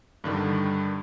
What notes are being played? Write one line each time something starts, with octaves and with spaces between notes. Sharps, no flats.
G2 D3 D#3 G3